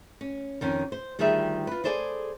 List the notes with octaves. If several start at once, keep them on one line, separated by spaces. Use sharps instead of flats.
C#4
F2 D#3 C#4
C5
D2 D#3 G3 F4 G#4 E5
F4 B4
G#4 A4 C5 D5 G5 G#5